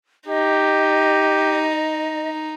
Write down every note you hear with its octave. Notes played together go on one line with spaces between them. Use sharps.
D#4 G4 D#5